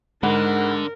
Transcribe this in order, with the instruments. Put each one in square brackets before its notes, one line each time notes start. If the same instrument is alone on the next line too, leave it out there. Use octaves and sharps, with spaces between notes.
[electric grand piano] G#2 F#5 B5 [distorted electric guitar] D3 [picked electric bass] G#3 [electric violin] A#4